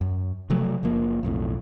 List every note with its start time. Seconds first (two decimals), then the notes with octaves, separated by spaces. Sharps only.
0.01 F#2
0.50 C3 F3 F#3 A3
0.83 F#1 F3 A#3
1.23 B1 F2 A2